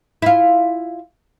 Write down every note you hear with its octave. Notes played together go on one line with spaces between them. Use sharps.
E4 F4